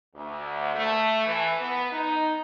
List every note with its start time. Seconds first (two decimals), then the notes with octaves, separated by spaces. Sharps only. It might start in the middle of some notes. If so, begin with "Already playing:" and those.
0.15 D2
0.75 A3
1.25 E3
1.59 B3
1.92 D#4